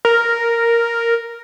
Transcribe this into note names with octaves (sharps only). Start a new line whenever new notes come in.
A#4